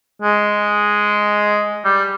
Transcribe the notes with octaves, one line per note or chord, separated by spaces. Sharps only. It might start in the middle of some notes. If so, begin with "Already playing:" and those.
G#3
G3